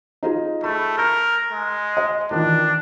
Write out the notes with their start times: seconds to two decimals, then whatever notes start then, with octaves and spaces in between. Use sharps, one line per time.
0.23 D#4 F4 G#4
0.64 A3 B5
0.98 A#4 G6
1.52 G#3
1.97 D#5
2.31 D#3 E3 D4 F4